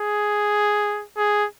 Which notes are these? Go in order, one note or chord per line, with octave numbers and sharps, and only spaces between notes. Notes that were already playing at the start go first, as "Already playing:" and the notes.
Already playing: G#4
G#4